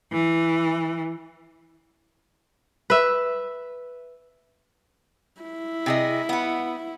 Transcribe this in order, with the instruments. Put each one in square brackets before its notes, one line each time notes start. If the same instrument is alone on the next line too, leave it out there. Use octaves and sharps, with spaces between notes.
[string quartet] E3
[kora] B4 E5
[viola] E4
[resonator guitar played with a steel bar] C3 G#4 D#5
B3 F#5